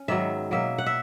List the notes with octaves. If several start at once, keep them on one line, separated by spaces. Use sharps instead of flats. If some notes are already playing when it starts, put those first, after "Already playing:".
Already playing: C#4
G#2 D#3 F#3 B3 E5
B2 F#3 A#3 E5
F#5
E5